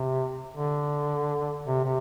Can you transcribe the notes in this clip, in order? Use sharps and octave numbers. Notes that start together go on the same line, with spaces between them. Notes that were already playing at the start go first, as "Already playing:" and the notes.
Already playing: C3
D3
C3
C3